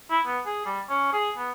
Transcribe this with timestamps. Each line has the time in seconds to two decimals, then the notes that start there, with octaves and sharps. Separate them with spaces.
0.11 E4
0.27 B3
0.46 G#4
0.66 G3
0.89 C#4
1.13 G#4
1.37 B3